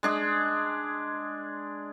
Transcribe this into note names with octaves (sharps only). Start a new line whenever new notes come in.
G#3 D4 G#4